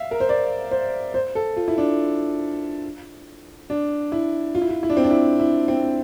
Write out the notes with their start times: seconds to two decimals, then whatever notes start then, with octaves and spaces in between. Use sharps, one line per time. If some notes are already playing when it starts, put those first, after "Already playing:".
Already playing: E5 F5
0.11 A#4
0.20 C5
0.29 D5
0.71 C5
1.14 C5
1.35 A4
1.56 F4
1.68 E4
1.78 D4
3.70 D4
4.12 E4
4.55 F4
4.62 E4
4.69 F4
4.83 E4
4.90 D4
4.97 C4
5.04 D4
5.11 E4
5.40 E4
5.68 C4